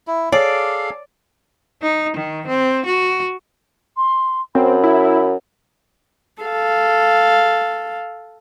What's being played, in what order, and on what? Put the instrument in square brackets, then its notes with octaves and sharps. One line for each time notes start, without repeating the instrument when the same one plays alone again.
[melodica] E4
[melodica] G#4 A4 F5 [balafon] C#5 [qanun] D5
[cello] D#4
D#3
C4
F#4
[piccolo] C6
[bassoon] F#2 [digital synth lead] C4 [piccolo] B5
[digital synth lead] E4
[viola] A4 F5